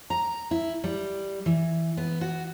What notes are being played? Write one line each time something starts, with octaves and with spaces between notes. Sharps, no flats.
A#5
E4
G3
E3
B3
F#4